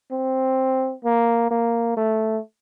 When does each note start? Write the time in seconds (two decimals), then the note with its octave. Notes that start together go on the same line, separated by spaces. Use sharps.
0.11 C4
1.04 A#3
1.50 A#3
1.97 A3